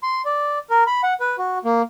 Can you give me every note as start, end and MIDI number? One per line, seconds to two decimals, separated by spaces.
0.03 0.22 84
0.25 0.59 74
0.70 0.84 70
0.87 1.01 83
1.03 1.14 78
1.20 1.36 71
1.38 1.58 66
1.64 1.82 58